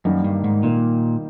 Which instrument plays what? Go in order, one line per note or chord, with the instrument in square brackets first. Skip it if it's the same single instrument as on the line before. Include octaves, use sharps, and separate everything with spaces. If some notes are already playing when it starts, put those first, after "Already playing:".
[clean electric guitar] F#2 [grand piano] D#3 G3 A#3 D#4
[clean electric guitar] G2
G#2
[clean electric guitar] A#2 [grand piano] D#3 G3 A#3 D#4